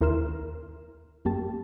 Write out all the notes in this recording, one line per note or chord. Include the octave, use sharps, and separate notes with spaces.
D#2 E4 A#4 C6 F6 E7
F#2 A#3 G4 A5